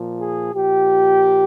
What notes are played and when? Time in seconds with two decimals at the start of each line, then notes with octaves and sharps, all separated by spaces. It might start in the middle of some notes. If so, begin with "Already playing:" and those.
Already playing: A#2 F3
0.20 G#4
0.54 A#2 F3 G4